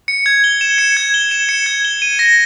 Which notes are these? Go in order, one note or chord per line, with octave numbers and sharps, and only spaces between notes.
C#7
G#6
G7
E7
C#7
G#6
G7
E7
C#7
G#6
G7
D#7
A#6